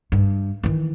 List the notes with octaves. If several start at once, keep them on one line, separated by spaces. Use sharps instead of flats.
G2
D#3 E3